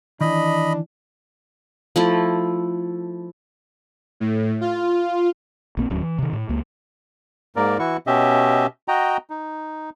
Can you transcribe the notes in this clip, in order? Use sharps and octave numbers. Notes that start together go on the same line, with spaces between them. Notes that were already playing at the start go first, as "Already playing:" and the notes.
D#3 E3 D4 D#5 B5
F3 A3 E4
A2
F4
A#1 A#3 C4
D1 D#2 F#3 C#4
E3
C3 D#3
A2
C#2 A#3
G#2 A#3 A#4 D5
E3 E4 F#4 C#6
B2 C#4 G4 D#5 E5
F#4 D#5 G5 A#5
D#4